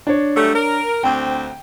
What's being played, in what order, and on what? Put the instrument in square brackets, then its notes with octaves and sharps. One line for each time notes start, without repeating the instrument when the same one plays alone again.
[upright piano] D4 C#5
[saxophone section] F#3 G3 A3
A#4
[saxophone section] D2 C4 [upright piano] G5